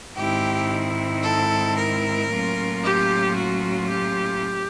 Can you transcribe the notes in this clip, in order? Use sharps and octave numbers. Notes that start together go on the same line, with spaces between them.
G#2 D#3 G#3 C4 E4 G4
A4
A#4
A2 F#3 A#3 C#4 F4
G4
F#4
G4